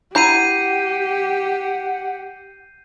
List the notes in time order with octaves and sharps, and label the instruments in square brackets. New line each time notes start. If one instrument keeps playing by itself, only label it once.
[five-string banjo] E4 A#5 [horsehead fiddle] G4 [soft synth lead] F#5 [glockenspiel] G6 C7 D#7